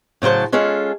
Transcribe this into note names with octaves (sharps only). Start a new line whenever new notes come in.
A2 C#3 F#3 C5 A5
G#3 C#4 F4 G#4 A4